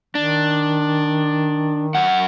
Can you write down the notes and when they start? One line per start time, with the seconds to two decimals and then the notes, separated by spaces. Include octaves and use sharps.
0.15 D#3 D4
1.95 F#2 F#5